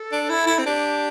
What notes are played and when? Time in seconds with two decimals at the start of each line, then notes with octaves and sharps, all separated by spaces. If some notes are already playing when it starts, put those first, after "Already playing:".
Already playing: A4
0.12 D4
0.29 E4
0.47 E4
0.59 C4
0.66 D4 G4